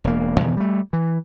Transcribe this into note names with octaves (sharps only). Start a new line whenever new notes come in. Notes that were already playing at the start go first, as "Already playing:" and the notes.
E1 A#3
E2 G2 B2 D#3
G3 A3
E3